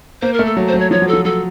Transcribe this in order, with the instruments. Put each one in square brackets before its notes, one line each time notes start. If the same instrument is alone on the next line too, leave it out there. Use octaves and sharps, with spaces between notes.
[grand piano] A#3 [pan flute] C5
[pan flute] A#4
[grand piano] A3
[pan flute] A4
[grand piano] F#3
[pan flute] C5
[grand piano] F#3
[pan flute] C#5
[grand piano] F3 [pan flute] C#5
[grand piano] F#3
[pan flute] A4
[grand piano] F3
[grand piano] F#3 [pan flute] A4